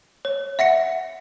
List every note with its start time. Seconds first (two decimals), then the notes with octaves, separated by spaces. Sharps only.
0.25 C#5
0.59 E5 F#5 A#6 C#7